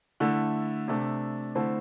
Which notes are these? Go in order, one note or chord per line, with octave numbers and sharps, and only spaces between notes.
D3 A3 E4
C3 A3 D4
D3 A3 C4 E4